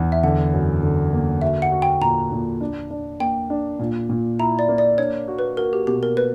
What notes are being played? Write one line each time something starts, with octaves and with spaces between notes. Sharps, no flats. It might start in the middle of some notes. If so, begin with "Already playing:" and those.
Already playing: E2
E5
D3 F#5
F#2
D3
A#3
F#4 E5
F#5
F#4
G5
A#2 A#5
A#2
D4
D4
A#3 G5
D4
A#2
A#2
E4 A#5
D5
A#3
D5
D4 C#5
F#4
B4
F#4 A#4
G4
B2 G4
A#4
B4